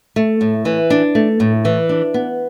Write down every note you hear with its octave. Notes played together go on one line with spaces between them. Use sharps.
A3
A2
E3
D4
A3
A2
E3
D4
B3